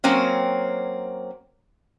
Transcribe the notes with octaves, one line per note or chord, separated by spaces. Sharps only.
F#3 A#3 C4 C#4